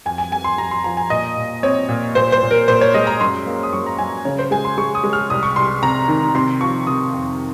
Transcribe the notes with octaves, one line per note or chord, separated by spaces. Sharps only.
F2 G#5
G#5
F2 G#5
C6
F2 A#5
C6
F3 A#5
G#5
A#2 D#5
A#2
C4 C#5
A#2
A#2 C5
C5
A#2
A#4
A#2 C5
C#5
G#3 D#5
A#5
F#2 C6
A#3
D#6
F#2 C#6
A#5
F#2 G#5
C#3 C#5
C5
G#3 G#5
C6
G#3 C#6
D#6
G#3
F6
C2 D#6
C#6
C2 C6
C3 A#5
D#3
C3 C6
F3 C#6
C3 D#6
F2